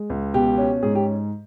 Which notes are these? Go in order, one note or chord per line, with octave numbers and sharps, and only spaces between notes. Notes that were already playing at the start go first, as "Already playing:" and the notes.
Already playing: G#3
C#2
B2 G4
C#4
G#2 G#4
G4